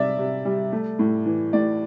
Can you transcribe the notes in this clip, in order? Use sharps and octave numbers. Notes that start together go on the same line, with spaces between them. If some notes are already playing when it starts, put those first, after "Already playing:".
Already playing: C3 G3 D5 E5
C3
G3
A3
A2
E3
A2 D5